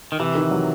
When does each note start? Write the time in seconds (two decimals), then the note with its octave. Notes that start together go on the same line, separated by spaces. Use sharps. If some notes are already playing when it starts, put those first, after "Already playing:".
0.12 D#3
0.20 C3 E3
0.35 D#3
0.51 F#3